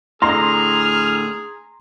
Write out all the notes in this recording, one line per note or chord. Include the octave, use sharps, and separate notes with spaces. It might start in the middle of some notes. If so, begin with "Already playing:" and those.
A2 D3 G#4 A#5 C6 F6